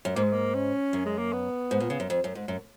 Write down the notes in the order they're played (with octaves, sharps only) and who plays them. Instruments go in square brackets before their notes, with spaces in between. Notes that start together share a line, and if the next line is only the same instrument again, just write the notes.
[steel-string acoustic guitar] F#2
[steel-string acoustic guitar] G#2 [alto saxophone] A#3
[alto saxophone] G#3
A#3
C#4
[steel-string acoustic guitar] F#2
[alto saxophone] G#3
A#3
B3
[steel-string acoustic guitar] G#2
A#2
C#3
F#2
F2
F#2
G#2
F#2